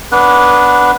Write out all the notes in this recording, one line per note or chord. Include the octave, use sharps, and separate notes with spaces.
B3 D4 B4